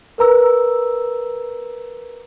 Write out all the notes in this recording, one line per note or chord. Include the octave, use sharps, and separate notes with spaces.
A#4 B4 A#5 E6